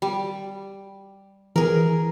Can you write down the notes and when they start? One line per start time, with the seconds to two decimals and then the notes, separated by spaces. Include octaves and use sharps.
0.02 G3
1.56 E3 G#4 A#4